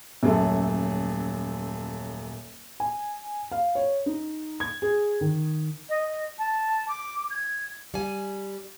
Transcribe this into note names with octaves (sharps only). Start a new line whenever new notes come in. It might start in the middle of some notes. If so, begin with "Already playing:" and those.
D#1 F#2 A3 A4
G#5
F5
C#5
D#4
G#6
G#4
D#3
D#5
A5
D6
G#6
G3 G#5